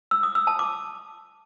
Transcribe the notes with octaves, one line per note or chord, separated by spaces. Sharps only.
E6
D#6
E6
A5
D6